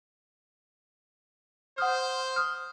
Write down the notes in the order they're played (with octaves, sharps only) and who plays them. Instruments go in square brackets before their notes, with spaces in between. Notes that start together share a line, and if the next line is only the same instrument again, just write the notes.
[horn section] C5 [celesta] F#5 D#6 F6
[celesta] D#6 F6